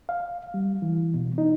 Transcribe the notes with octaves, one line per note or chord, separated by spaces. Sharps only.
F5
G3
E3
B2
D#4